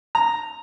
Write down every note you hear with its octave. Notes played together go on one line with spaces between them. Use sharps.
A#5